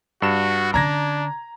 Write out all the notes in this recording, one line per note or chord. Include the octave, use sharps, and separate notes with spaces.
G2 F#4 E7
D3 C#4 D4 A#5 G#6 A#6